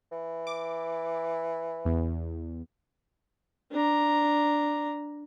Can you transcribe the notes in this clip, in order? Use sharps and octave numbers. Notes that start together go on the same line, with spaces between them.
E3
D6
E2
D4 A#5